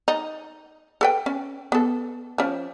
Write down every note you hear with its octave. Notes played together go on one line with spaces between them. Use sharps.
D#4
A4 B4 G5
C#4
B3 A4
F3 C#4